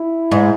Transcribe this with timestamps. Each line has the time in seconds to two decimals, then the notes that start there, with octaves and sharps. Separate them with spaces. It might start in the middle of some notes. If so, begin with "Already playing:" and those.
Already playing: E4
0.32 G#2